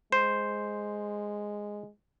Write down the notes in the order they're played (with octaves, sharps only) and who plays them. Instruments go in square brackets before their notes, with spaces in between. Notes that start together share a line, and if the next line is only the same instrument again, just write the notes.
[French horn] G#3 [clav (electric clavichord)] C5